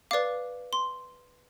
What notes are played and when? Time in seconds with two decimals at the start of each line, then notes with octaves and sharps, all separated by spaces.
0.11 B4 D5 F5 D6
0.73 C6